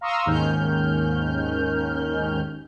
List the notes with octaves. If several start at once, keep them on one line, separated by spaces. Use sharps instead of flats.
F5 A#5 C6 C#6 D#6 E6
D#2 G#2 D#3 C#4 F6 G6